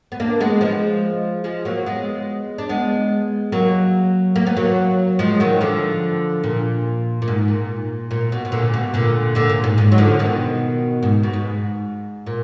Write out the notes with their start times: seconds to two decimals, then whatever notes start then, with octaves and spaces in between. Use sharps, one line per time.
0.12 B3
0.20 A#3 D4
0.40 G#3 B3
0.61 F3 G#3
1.44 F3 G#3
1.65 F#3 A#3
1.86 G#3 B3
2.58 D4
2.69 G#3 B3
3.52 F#3 A#3
4.36 A#3
4.47 B3
4.57 F#3 A#3
5.19 F3 G#3
5.40 D#3 F#3
5.61 D3 F3
6.44 A#2
7.22 A#2
7.28 G#2
7.48 A#2
8.11 A#2
8.32 B2
8.45 B2
8.52 A#2 D3
8.74 B2
8.94 A#2 D3
9.35 A#2 D3
9.49 A#2
9.64 G#2
9.78 G#2
9.92 F#3
9.98 D3 F3
10.19 B2 D#3
11.03 G#2
11.23 B2
11.34 G#2
12.27 A#2